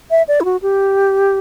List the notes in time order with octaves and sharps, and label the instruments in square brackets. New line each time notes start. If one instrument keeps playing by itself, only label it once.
[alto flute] E5
D5
E4
F#4
G4